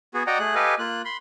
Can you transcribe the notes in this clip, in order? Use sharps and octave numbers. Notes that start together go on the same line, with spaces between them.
B3 F#4 G#4
F#4 D5 D#5 F#5 G5 A#5
A3 G#4 F#6
G4 A4 B4 D#5 F5 G#5
A#3 F4 F#6
B5 C6